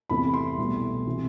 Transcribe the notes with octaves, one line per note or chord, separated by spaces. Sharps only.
E2 C3 E3 A3 B5
C6
C2 B2 A3
C3 E3